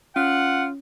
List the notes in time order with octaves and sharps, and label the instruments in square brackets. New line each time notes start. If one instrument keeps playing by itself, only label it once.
[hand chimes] C#4 [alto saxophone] F4 [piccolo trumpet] F#5